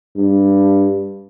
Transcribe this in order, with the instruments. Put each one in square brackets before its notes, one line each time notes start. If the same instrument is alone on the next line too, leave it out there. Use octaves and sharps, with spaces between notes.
[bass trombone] G2